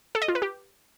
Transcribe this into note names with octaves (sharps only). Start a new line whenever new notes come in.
A4
D#5
F4
B4
G4